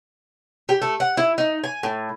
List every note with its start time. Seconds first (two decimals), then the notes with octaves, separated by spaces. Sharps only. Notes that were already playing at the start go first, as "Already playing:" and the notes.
0.69 G4
0.82 A3
1.00 F#5
1.17 E4
1.38 D#4
1.64 G#5
1.83 A2